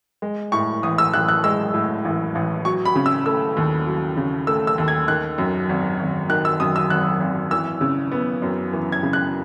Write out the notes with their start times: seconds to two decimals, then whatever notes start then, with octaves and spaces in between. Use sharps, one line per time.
0.22 G#3
0.52 A2 C#6
0.83 A1 D#6
0.98 E6
1.13 A1 F#6
1.29 F#6
1.44 G#3 E6
1.74 A2
2.05 A1
2.35 A1
2.65 F#3 C#6
2.85 B5
2.95 C#3
3.06 E6
3.26 A3 E6
3.57 D#2
3.87 F#3
4.17 C#3
4.47 A3 E6
4.67 E6
4.78 D#2
4.88 G#6
5.08 D#3 F#6
5.38 F#2
5.69 G#1
5.99 G#1
6.29 D#3 F#6
6.45 E6
6.60 F#2 D#6
6.76 E6
6.90 G#1 F#6
7.21 G#1
7.51 E3 E6
7.81 C#3
8.11 B3
8.42 F#2
8.73 E3
8.92 G#6
9.03 C#3
9.13 F#6